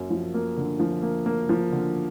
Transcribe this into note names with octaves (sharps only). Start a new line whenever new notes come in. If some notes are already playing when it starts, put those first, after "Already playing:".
Already playing: F#2 A#3
F3
A#3
D3
F3
A#3
A#3
F3
D3